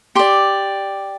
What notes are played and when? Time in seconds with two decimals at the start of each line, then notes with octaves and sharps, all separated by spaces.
0.15 G4 D5 C6